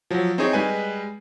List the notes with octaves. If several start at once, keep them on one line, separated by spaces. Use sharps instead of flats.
F3 F#3
C4 D#4 E4 G#4 C#5
G3 G#3 B4 G#5